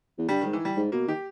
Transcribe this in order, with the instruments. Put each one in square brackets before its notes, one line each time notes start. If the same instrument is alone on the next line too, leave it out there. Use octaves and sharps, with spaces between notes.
[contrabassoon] E2
[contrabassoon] G2 [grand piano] G3
[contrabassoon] G#2 [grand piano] D#3
[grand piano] E3
G3
[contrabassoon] G#2
[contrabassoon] B2 [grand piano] A#3
[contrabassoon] D#3 [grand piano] G4